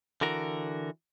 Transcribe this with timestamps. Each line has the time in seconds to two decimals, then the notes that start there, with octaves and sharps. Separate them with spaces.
0.21 D3 E3 F#4 A#4